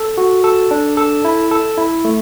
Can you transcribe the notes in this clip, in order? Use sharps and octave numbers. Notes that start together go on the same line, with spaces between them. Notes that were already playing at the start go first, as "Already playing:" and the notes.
Already playing: A4
F#4
A4
D4
A4
E4
A4
E4
A3